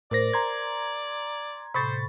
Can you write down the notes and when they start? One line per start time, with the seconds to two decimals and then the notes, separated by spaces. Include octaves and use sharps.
0.11 A2 A#4 C5 D5 A#6
0.33 A#5 C6 G#6
1.74 A2 C3 C5 B5 C#6 A6